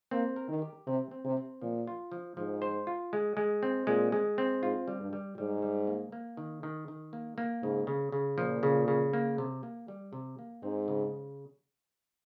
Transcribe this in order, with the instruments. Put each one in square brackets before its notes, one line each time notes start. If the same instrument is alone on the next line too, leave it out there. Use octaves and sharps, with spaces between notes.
[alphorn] A#3 [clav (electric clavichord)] C4
[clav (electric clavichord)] A#4
[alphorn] D#3
[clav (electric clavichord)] G4
[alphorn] C3 [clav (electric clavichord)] C4
[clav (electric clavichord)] C4
[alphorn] C3
[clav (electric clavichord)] C4
[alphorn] A#2 [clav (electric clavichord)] F3
[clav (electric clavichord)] F4
F3
[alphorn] G#2 [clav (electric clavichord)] F3
[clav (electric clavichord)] C5
F4
G#3
G#3
C4
[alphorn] A#2 [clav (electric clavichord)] G#3
[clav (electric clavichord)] G#3
C4
[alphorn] G#2 [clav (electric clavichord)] F4
[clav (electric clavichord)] G3
[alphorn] G2
[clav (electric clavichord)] G3
[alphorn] G#2 [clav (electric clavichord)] G3
[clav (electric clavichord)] G3
A#3
A#3
D#3
D#3
D#3
A#3
A#3
[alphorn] G#2 [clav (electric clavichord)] C#3
[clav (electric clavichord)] C#3
C#3
[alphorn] A#2 [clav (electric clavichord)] F3
[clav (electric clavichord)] C#3
C#3
A#3
C3
A#3
G3
C3
A#3
[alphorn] G#2 [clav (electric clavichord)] C4
[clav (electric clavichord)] C#3